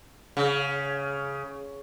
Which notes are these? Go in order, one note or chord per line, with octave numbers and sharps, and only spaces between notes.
C#3